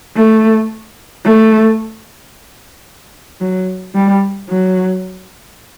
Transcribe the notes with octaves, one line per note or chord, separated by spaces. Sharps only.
A3
A3
F#3
G3
F#3